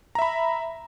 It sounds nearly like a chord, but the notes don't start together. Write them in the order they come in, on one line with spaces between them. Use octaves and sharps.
A#5 E5 B5